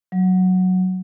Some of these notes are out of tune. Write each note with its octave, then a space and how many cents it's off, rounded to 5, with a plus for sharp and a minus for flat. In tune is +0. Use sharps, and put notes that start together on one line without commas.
F#3 -5